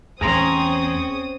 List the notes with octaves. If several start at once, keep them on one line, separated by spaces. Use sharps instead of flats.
E2 A3 C4 C#4 G#4 A#5 C6 D#6